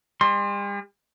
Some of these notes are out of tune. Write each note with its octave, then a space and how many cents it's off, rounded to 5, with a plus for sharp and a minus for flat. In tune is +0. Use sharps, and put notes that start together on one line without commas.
G3 +45 C6 +10